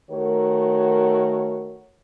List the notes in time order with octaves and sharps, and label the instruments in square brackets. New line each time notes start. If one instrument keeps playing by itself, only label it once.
[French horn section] D#3 A3 F#4 A#4 C#5